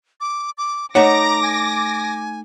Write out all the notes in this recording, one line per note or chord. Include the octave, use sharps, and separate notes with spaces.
D6
D6
A3 D#4 C#5 F#5 A#5 D6 A#6
G#5